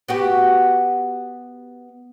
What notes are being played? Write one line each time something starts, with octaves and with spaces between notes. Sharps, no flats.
B3 F#4 G4